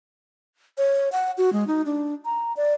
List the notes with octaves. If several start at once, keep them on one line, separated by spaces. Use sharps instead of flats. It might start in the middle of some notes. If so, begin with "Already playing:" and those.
C#5
F#5
F#4
G#3
D#4
D4
A#5
D5